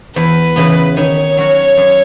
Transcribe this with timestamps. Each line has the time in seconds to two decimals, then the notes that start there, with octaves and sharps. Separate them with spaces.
0.16 E2 B4
0.56 C#3 E3 B3
0.96 D#3 C#5
1.37 F#3 C#4 F#4
1.77 F#2